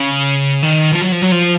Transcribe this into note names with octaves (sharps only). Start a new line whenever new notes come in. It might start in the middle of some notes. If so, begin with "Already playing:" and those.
Already playing: C#3
D#3
F3
F#3
F3
F#3
F3